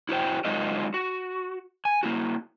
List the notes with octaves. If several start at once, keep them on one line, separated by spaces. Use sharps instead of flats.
E4 F#4 C5 G5
F#3 G#3 D#4 F4 A#4 D#5
F#4
G#5
A#3 E4 F#4